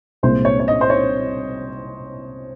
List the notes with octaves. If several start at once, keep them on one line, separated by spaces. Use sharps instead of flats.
C2 A#2 G#3 C5
C#5
C#5
D#5
C5
C#5